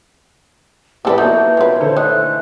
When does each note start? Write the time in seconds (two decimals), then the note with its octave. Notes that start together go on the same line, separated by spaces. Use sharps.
1.05 A1 C4 E4 G4 A4 B4 D5
1.18 F#3 A#3 B3 D#4 F#4 A4 A5 G6
1.57 A#2 D#3 C#4 B4 C#5 C6
1.81 D3 A4 C5
1.97 E3 A3 D#4 E5 F#6